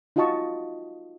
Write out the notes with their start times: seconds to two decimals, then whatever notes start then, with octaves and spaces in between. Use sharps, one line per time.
0.16 D#4 F4 F#4 D#5 A5 C#6